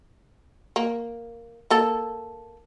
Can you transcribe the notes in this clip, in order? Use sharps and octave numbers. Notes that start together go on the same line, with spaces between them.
A#3
A#3 A4